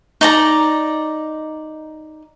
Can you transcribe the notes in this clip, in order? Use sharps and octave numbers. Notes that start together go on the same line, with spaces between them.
D#4 D5 A#5